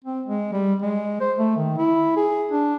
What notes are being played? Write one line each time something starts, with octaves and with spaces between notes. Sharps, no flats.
C4
G#3
G3
G#3
C5
A3
D#3
E4
G#4
D4